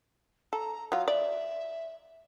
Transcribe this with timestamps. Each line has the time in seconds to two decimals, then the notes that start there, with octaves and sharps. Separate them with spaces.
0.53 A4 A#5
0.92 F#3 F4 F5
1.08 D5 E5